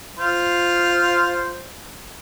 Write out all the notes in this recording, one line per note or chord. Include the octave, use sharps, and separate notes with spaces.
F4 C5